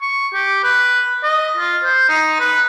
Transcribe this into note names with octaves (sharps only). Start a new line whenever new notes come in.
C#6
G4
B4
D#5
F4
C5
D#4
B4